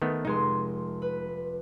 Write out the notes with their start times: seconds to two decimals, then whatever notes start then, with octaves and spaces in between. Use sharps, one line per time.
0.02 D#3 A3 B3
0.25 F1 G#3 D#4 C6
1.02 B4